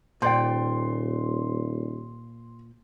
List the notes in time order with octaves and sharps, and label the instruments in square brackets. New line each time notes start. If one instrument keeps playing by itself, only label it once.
[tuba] D#1 [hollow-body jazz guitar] A#2 [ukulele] C5 D5 G5 [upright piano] C6